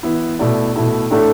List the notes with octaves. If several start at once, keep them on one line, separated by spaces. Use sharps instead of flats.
E3 B3 E4
B2 A3 E4 D5
B2 A3 E4 A4
A2 A3 D4 A4